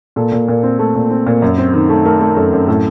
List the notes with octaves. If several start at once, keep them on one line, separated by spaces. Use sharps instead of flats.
A#2 A4
A#2
A#2
C4
A3
A#2
C4
A#2
F#2
C4
D#3
A3
A3 A#4
A3
F#2 A4
F#2
A2 A4